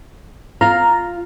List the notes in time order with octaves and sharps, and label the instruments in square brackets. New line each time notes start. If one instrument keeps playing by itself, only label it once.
[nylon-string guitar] F4 F5 [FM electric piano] A#5